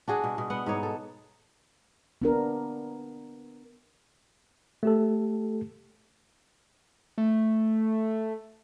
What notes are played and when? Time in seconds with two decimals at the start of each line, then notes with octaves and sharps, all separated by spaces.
0.08 D4 F#4 G#4
0.24 B2
0.38 B2
0.50 B3 F#5
0.66 G#2 D#4 C#5
0.83 A4
2.22 B3 D4 A#4
4.83 A3 G4 A4
7.18 A3